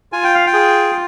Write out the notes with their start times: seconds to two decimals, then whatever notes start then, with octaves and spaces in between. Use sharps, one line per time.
0.12 F4 G#5
0.24 G5
0.34 F5
0.47 G5
0.53 G#4